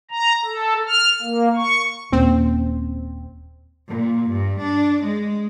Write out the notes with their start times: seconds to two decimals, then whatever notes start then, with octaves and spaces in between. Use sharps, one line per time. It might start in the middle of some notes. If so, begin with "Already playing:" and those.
0.11 A#5
0.45 A4
0.86 F6
1.22 A#3
1.56 C#6
2.12 D#1 A#3 C4 C#4
3.89 A#2
4.31 G2
4.62 D4
5.05 G#3